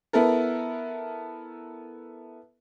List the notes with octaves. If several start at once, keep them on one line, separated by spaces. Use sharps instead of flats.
B3 E4 A4 A#4